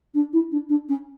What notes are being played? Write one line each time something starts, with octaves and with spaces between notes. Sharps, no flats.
D4
E4
D4
D4
C#4